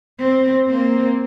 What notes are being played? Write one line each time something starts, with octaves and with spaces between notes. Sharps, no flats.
C4
A#3 C4